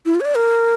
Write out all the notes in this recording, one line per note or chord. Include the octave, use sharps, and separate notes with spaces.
E4
F4
C#5
D5
A#4